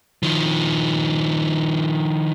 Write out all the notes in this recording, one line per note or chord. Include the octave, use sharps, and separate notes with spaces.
D#3 F3